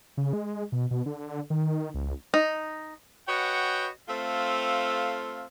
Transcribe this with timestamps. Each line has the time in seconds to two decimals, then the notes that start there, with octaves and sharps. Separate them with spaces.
0.17 C#3
0.33 G#3
0.72 B2
0.91 B2
1.06 D3
1.50 D#3
1.94 C#2
2.34 D#4
3.27 F#4 B4 C#5 D#5 F#5 G5
4.08 A3 C4 F4 A4 F5